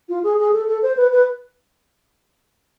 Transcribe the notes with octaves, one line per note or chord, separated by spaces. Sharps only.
F4
G#4
G#4
A4
A4
C5
B4
B4